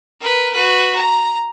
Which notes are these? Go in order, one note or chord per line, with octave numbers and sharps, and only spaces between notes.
A#4 B4
F#4 B4
A#5